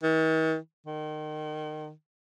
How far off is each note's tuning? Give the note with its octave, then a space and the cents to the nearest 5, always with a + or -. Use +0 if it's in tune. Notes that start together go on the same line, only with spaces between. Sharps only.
D#3 +45
D#3 -25